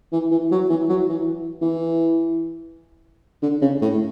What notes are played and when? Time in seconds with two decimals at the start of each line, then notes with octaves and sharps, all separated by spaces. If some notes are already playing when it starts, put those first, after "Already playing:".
0.12 E3
0.31 E3
0.51 F#3
0.70 E3
0.89 F#3
1.09 E3
1.61 E3
3.42 D3
3.61 C#3
3.82 A2